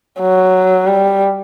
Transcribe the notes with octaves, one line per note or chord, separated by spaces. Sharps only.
F#3
G3